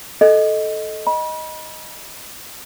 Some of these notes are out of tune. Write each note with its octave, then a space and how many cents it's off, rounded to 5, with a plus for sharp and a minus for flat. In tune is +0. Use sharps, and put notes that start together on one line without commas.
A4 -10 D#5 +0
D#5 +0 B5 -35